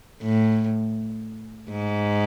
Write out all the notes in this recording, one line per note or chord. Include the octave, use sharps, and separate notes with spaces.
A2
G#2